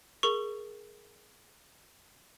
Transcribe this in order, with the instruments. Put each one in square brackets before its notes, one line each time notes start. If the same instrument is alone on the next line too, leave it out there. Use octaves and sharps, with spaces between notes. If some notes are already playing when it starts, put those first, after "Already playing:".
[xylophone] G#4 A#4 C#6